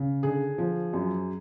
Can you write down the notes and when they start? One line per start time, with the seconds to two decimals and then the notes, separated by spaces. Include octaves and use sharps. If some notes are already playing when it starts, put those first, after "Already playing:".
Already playing: C#3
0.23 D3 G#4
0.58 F3
0.93 F#2